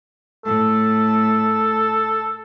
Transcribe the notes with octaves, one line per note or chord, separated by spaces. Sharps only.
A2 A4